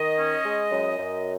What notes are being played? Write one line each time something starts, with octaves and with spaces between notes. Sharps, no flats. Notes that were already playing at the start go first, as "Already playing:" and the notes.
Already playing: D#3 D#5
C#4
G#3
F#2
F#2